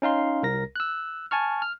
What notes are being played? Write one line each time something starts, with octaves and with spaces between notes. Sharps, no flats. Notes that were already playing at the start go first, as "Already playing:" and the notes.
C#4 D#4 F5 C6
C2 A#4 A#6
E6 F#6
G#5 A5 C#6 F6
F6